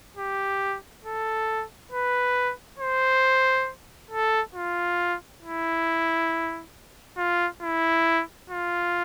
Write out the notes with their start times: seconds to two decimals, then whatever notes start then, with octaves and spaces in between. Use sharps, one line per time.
0.16 G4
1.04 A4
1.92 B4
2.79 C5
4.11 A4
4.55 F4
5.43 E4
7.17 F4
7.62 E4
8.50 F4